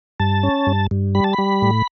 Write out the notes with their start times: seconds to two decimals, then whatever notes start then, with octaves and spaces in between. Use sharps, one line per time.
0.20 G2 A5
0.43 C#4
0.67 G2
0.91 G2
1.15 G3 B5
1.24 A5
1.33 B5
1.38 G3
1.62 A2